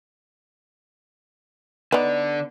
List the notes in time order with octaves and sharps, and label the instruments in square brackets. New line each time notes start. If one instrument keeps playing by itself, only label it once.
[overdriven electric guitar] D3 D5 [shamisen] B3 D#4